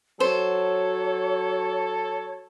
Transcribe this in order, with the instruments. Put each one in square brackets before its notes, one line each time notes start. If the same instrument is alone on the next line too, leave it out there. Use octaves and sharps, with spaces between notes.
[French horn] F#3 [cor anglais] A4 [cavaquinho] C5 [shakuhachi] C#5